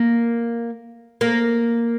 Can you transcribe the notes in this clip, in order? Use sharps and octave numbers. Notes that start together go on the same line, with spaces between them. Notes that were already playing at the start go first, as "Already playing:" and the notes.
Already playing: A#3
A#3